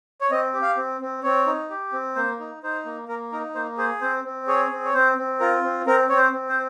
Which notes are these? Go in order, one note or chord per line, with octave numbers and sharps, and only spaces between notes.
C#5
C4 D#5
G4
F5
C4
C4
C4 C#5
D#4
G4
C4
A#3 C5
D#4
D#4 C5
A#3
A#3 A#4
D#4 A#4
A#3 C5
G#4 C5
C4 C5
C4
G#4 C#5
C4
C#5
C4 C5
C4
F4 A#4
C4
C4 A#4
C4 C#5
C5
C4
C5